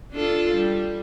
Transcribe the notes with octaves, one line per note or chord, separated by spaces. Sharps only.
D4 F4 A4
G3